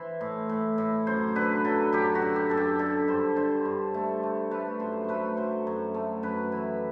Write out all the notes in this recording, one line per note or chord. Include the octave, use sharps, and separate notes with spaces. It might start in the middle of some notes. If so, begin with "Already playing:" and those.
Already playing: E3 C5
A2
A2
A2
F#2 C5
D3 B4
F#3 A4
F#2 G4
F#4
D3
G4
F#2 A4
G4
D3 A4
G2 C5
D3 C5
G2
A3
A3
A3 B4
F#2 C5
A3 B4 C5
F#3 C5
F#2
A3
F#2 B4
E3